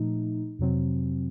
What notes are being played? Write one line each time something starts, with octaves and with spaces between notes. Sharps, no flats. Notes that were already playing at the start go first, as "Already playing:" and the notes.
Already playing: A#2 F3 A3 D#4
F2 C3 F#3 C4